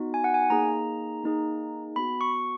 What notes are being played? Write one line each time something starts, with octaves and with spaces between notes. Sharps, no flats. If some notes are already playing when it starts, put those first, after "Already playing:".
Already playing: B3 D#4 F#4
G#5
F#5
G#5
A#3 D#4 G#4 A#5
A#3 D#4 G#4
B3 F#4 B5
C#6